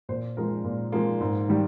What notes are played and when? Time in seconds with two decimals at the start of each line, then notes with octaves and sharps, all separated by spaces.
0.09 A#2 C5
0.37 F3 G#3 A#4
0.64 A#2
0.92 F3 G#3 A#3
1.21 G#2
1.49 D#3 G3